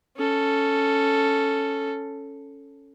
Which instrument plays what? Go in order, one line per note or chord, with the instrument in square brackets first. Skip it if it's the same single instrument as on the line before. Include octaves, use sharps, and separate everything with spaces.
[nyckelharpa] C#4 A4